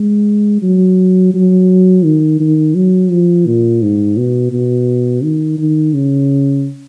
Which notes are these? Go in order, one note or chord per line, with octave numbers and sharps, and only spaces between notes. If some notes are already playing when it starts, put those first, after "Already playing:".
Already playing: G#3
F#3
F#3
D#3
D#3
F#3
F3
A#2
G#2
B2
B2
D#3
D#3
C#3